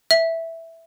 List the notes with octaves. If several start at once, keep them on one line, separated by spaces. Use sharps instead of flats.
E5